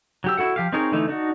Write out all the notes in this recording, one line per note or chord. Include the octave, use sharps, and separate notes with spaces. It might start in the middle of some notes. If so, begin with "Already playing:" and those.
F#3 G4 E6
E4 F#4 A4 F#5
F3 G4 F5
C4 D#4 G#4 A#4 C#5
D3 E3 A3 D#4
D4 D#4 F#4